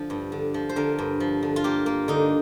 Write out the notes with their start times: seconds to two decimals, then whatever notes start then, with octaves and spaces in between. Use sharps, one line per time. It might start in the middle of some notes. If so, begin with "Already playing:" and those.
Already playing: D3 F3
0.10 G2
0.32 D3
0.54 F3
0.69 C5
0.76 D3 A#4
0.99 G2
1.20 F3
1.43 D3
1.56 F4
1.64 A#3 G4
1.86 A#3
2.08 D3 D#4